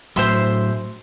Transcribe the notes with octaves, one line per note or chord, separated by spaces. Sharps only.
A2 F#3 C5 E5 C6